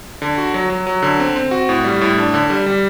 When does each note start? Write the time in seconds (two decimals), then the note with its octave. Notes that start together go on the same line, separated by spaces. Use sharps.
0.22 D3
0.38 F#4
0.54 F#3
0.70 F#3
0.87 F#3
1.02 D3
1.20 C4
1.36 C4
1.51 F#4
1.69 A2
1.84 G3
2.01 A2
2.18 D4
2.34 D3
2.50 G3
2.66 G3